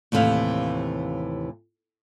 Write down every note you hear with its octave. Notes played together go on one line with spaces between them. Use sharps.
D#2 A2 C3 E3 F5